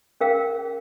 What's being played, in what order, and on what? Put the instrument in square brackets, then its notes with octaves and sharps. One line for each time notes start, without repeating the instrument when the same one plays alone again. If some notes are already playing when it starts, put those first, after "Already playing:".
[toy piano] C#4 G#4 A#4 F5 G5